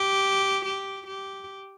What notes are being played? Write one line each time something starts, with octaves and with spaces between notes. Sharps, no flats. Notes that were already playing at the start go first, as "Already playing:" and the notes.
Already playing: G4
G4
G4